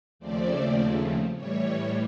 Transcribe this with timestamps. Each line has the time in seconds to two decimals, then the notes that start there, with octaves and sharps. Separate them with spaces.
0.19 D#2 C#3 F3 A3 C4 D5
1.35 A2 E3 G3 C#5